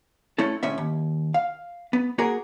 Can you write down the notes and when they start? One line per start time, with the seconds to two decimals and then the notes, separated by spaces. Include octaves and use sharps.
0.38 A3 C#4 E4 A4
0.63 D2 A2 C#4 E5
0.78 D#2
1.34 F5
1.93 B3
2.18 A#3 F#4 G#4 A#4